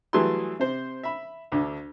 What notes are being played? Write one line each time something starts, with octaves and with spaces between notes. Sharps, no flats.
E3 F#3 G3 A3 G#4 C6
C3 C5
E5 B5
D2 D3